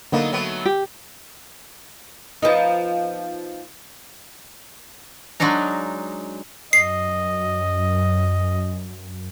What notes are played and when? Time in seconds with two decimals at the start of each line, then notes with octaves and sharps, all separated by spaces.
0.12 D3 F#3 A#3 B3 D#4
0.32 F#3 A3 B3
0.66 G4
2.42 F3 B3 D#4
5.40 F#3 G#3 D4 D#4 A#5
6.73 F#2 D#5 C7